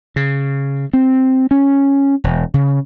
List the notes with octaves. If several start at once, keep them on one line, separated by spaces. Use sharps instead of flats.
C#3
C4
C#4
E1
C#3